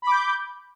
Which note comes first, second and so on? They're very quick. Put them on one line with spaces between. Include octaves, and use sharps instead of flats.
B5 D6 G6